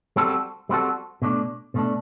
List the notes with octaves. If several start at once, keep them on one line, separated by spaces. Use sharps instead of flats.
G3 C4 F#4 A4
G3 C4 F#4 A4
B2 A3 D4
B2 A3 D4